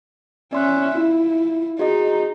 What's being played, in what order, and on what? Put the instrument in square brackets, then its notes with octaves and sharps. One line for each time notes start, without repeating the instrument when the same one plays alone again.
[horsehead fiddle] C#4 E5 [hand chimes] D5 C6 F#6
[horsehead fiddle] E4 [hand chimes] F4
[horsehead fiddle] D#4 [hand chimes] F#4 G#4 D#5